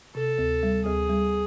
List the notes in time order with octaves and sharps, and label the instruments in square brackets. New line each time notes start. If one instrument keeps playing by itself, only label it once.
[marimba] C3 [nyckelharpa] A4
[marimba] D2
G3
[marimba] D2 [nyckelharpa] G#4
[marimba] G3